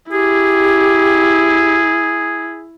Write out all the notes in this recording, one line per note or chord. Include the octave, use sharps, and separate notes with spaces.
E4 G4 G#4